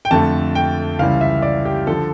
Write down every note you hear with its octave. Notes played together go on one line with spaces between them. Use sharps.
G5
F2 D3 A3 A5
G5
C#2 C#3 E3 G3 F5
E5
D5
G4
D3 F3 A4